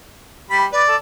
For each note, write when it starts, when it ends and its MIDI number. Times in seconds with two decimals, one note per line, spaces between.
0.50 0.66 55
0.50 0.66 83
0.72 0.82 71
0.72 0.96 74
0.88 0.96 69